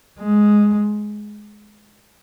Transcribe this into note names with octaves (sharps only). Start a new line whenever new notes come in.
G#3